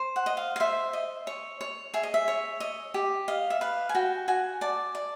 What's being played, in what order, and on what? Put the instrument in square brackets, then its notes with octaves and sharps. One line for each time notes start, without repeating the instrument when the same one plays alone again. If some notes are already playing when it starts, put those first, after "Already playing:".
Already playing: [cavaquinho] C5
F#5
D#5
F5
F5
C5 E5
D#5
C#5
C#5
G#4 E5
D#5
E5
C#5
D#5
G4
D#5 F5
E5
B4 F5
G#5
F#4 G5
F#4 G#5
D5 A5
D5